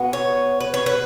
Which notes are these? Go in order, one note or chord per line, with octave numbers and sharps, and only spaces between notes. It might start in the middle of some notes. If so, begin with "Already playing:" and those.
Already playing: B2 G#3 B3
C#5
B4
C#5
B4